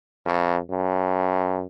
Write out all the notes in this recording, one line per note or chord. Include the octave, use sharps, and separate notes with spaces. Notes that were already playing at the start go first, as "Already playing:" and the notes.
F2
F#2